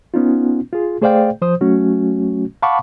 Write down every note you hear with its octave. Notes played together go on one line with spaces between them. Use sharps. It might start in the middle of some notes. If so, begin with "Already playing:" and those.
B3 C#4 D#4 F4
F4 G#4
A3 G#4 C5 D5 F5 G5
F3 C5 D#6
F#3 A3 C#4 F#4
F5 F#5 A5 B5 C#6 D6